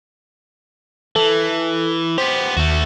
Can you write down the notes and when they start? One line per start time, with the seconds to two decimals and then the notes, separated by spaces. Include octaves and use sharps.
1.16 E3 A4
2.18 B3 G4 C5
2.57 D#2 A3 F#4